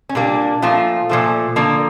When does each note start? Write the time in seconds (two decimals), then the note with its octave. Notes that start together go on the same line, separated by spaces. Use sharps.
0.09 C#4
0.15 A#2 G3 A#3 D4
0.62 A#2 F3 A3 F4
1.09 A#2 F3 A3
1.56 D3 F3 A#3 A#4